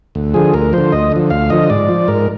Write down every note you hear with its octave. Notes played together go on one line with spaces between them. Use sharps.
D2
D3 F3 G#4
D2 A#4
D3 F3 C5
D2 D#5
D3 F3
D2 F5
D3 F3 D#5
G#2 D5
F3
G#2 A#4